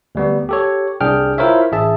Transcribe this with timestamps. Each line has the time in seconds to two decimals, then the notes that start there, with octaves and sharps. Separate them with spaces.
0.15 D2 G3 B3
0.49 G4 A4 C#5
1.01 C2 D4 G#4 G5 F6
1.38 E4 F4 A#4 C5 C#5 E5
1.72 A1 G#4 E5 A5